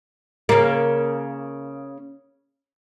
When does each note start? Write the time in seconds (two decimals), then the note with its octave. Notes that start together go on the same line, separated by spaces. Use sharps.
0.49 C#3 A#3